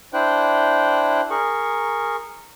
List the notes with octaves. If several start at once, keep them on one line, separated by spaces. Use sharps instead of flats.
D4 E4 C5 G5 F#6
G#4 A#4 C#6